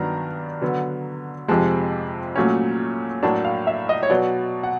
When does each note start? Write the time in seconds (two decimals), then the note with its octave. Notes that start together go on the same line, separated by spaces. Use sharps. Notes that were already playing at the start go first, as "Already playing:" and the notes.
Already playing: G2 D#3 F#3 B3 D4 A#5
0.61 D3 F#3 B3
1.48 F2 C3 F3 G#3 A5
2.36 A#2 F#3 A3 C#4
3.23 A2 F#3 A#3 D4 A5
3.45 F5
3.67 E5
3.89 D#5
4.03 C#5
4.10 B2 F#3 B3 D5
4.63 F#5